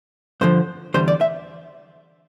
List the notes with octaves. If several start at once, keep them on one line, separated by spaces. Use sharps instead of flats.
G2 D3 F3 C5
E2 D3 G3 C5
D5
E5